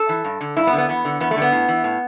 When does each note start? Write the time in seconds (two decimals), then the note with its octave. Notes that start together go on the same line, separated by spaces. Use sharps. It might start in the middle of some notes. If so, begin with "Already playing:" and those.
Already playing: A4
0.09 E3
0.24 G2
0.41 D3
0.57 G2 E4
0.67 B3
0.73 D3
0.78 B3
0.89 E2 B3
1.05 D3
1.20 E2 B3
1.31 A3
1.36 D3
1.42 B3
1.52 A2
1.68 E3
1.84 A2